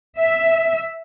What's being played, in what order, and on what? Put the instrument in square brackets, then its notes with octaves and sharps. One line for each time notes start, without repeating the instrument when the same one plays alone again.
[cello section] E5